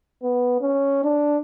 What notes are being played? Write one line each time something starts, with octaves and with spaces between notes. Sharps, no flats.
B3
C#4
D4